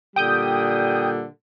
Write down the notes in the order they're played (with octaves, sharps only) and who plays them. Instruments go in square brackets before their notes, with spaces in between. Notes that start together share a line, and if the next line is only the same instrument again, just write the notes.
[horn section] A#2 D3 G3 [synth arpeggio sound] G5 D#6 G6